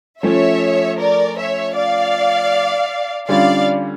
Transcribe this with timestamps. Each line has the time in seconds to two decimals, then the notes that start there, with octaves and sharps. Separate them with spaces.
0.22 F3 A3 C#4 C#5 E5
0.99 A#4 D5
1.37 C#5 E5
1.75 D5 F5
3.28 D3 G3 C#4 F4 D5 F5